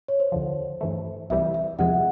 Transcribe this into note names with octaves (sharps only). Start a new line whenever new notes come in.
C#5
C5
D#2 D3 F3
G2 E3 A3
C2 C3 E3 G3 E5
E5
E2 C3 F3 G#3 F#5